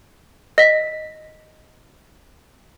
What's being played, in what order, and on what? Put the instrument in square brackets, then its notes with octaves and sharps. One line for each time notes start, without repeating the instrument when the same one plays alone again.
[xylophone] D#5 B6